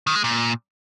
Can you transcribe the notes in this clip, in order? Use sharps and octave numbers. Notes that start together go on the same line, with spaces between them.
D#3
G#3
A#2